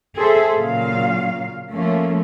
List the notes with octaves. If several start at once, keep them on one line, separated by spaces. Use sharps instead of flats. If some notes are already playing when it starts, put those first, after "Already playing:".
G#4 A4 C5 E5
A#2 C#3 F#3 F5
F3 A3 A#3 C#4